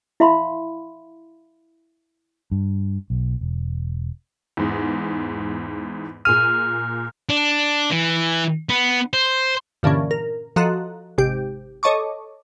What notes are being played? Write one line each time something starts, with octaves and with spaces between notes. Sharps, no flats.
E4 E5 F5 B5 C6
G2
B1
E1
E2 G#2
A#2 G#4 F6 D#7
D4
E3
B3
C5
G2 A#2 D3 E3 C#4
A#4
F3 F#4 A4 D#5 A#5 F#6
G#1 C3 G4
A4 C#5 D#5 A5 C#6 D6